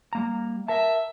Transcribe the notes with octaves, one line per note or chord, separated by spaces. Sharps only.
G3 A#3 A#5
A#4 E5 A5